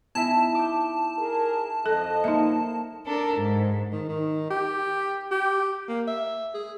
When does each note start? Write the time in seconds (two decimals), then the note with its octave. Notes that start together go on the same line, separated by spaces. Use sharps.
0.15 B3 D#4 E4 E5 A5
0.55 D6 G6
1.19 G#4 A#4
1.86 F2 A4 D#5 A#6
2.24 A#3 D#4 E5
3.05 D4 A4 A#4
3.36 G#2
3.92 D#3
4.08 D#3
4.51 G4
5.31 G4
5.88 A#3
6.07 E5
6.54 G#4